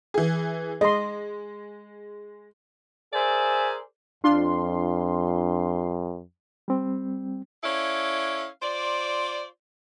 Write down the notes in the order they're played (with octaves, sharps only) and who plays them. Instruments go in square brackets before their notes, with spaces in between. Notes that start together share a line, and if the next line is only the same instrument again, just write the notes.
[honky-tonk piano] E3 G#4
[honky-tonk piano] G#3 [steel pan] D#5 C6
[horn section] G#4 A#4 C5 D5 E5 G#5
[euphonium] F2 [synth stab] D4 F4 C6
[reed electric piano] G3 C4
[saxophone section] C#4 E4 A4 D5 F5
F4 C5 D5